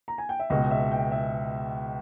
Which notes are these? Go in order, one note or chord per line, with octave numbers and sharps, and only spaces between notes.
A#5
G#5
G5
E5
C#2 B2 G#3 D#5
E5
G5
E5